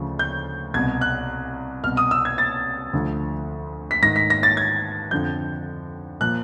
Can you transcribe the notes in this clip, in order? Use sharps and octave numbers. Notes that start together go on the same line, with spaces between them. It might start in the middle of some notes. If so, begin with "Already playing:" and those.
Already playing: D2 C#3 F3
G6
C2 B2 G#6
F#6
C2 B2 F6
D#6
E6
G#6
A6
D2 D3 F3
B6
G#2 D#3 A#6
B6
A#6
A6
G#6
F2 D3 F3 G6
A#2 F3 F#6